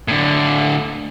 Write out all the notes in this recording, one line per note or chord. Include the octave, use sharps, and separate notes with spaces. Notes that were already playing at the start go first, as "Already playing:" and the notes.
A2 D3